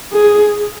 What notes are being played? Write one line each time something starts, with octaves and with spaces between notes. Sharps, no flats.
G#4